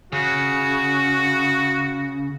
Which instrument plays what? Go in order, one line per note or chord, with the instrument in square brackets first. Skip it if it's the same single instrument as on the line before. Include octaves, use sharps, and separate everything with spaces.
[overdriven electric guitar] C#3 [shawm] F#4